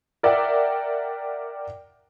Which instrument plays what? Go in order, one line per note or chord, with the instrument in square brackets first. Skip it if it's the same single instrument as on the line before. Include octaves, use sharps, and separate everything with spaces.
[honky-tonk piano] A#4 D5 E5 F#5 G5